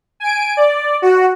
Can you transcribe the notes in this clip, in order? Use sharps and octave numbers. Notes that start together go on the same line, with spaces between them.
G#5 D7
D5
F#4